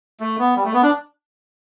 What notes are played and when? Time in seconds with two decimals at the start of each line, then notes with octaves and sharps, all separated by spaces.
0.20 A3
0.39 B3
0.56 G3
0.64 A3
0.74 B3
0.83 D4